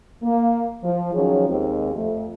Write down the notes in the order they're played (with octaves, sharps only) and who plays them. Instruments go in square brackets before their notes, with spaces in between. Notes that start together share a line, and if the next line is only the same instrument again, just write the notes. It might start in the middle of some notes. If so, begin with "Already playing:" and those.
[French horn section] A#3
F3
D#3 F3 F#3 C#4 G#4 C#5
D#2 G#3 C4
F2 A3